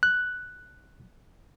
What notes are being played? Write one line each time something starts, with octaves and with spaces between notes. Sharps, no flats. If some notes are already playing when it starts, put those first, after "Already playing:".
F#6